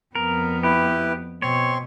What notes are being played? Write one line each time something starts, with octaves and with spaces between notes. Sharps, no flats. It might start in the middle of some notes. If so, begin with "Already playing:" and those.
F2 B3 A#4
E4 G4 B4
B2 C4 C#5 C6 C#6